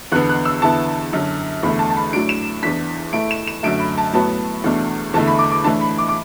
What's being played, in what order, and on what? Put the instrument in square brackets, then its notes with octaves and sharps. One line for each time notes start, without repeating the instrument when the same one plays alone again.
[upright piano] E2 D3 B3 F#6
F#6
E6
E2 D3 B3 E4 A5
F#2 D3 F#3
E2 D3 A3 B5
A5
A5
B5
A2 F#3 D4 D7
E7
E2 E3 D4 B6
A2 A3 E4 D7
E7
E7
F#2 D3 A3 D7
B5
A5
A2 F#3 B3 A5
E2 B2 A3 D4
E2 D3 A3 E4 A5
B5
D6
D6
A2 E3 D4 A5
B5
D6
D6